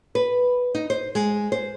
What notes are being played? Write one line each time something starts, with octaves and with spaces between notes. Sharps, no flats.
B4
D#4
C5
G#3
C5